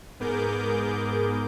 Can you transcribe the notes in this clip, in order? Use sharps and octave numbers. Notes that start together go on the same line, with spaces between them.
G#2 B3 G#4 A#4 D6 G6